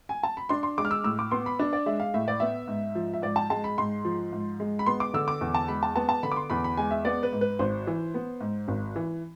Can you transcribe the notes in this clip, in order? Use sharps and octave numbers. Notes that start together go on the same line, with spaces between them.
G#5
A5
B5
D4 C6
C6
G#3 D6
F6
E6
A2 E6
D6
B3 C6
B5
D4
D5
G#3 E5
F5
A2 E5
D5
B3 E5
G#2
F3
E5
G#2 D5
A5
G#3 A5
B5
G#2 C6
F3
G#2
G#3
B5
B3 C6
D6
D3 E6
D6
E2
A5
G#3 B5
A5
B3 A5
A5
D3 B5
D6
C6
E2 B5
B5
G#3 G#5
E5
B3 D5
B4
G#2
B4
G#1 C5
E3
B3
G#2
G#1
E3